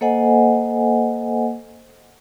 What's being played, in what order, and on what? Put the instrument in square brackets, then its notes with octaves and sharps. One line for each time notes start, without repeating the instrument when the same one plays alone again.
[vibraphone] A#3 A4 C5 D#5 F#5 G#5